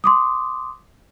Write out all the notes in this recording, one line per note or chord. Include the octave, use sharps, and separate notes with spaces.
C6 D6 D#6